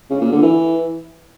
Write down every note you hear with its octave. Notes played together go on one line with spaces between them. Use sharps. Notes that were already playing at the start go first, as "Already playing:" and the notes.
C#3
A#2
D3
E3